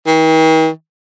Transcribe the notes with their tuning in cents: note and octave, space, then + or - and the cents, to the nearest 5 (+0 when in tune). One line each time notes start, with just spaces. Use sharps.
D#3 +45